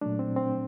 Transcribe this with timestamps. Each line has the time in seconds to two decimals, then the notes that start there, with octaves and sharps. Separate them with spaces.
0.01 A#2 F#3 A3 D4
0.19 C4
0.36 C4